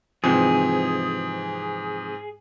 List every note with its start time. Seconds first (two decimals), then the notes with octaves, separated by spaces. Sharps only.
0.24 G#2 C3 E3 F3 G#4